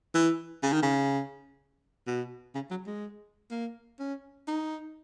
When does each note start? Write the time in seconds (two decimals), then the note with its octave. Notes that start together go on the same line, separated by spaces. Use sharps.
0.14 E3
0.63 C#3
0.73 D#3
0.83 C#3
2.07 B2
2.55 C#3
2.70 F#3
2.86 G#3
3.51 A#3
3.99 C#4
4.48 D#4